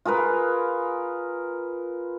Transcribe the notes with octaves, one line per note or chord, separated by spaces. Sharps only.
F4 G#4 A#4 B4